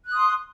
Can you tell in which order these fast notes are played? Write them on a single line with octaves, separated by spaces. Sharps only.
F#6 D#6 C6